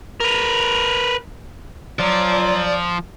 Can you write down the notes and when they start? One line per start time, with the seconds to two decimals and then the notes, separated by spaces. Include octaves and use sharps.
0.20 A#4 B4
1.99 F3 F#3 D5